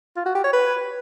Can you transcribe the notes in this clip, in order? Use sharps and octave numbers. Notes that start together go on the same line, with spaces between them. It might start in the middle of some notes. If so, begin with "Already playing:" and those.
F4
F#4
G4
C#5
B4